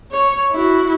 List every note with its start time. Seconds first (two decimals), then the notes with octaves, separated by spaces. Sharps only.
0.12 C#5
0.52 E4 F#4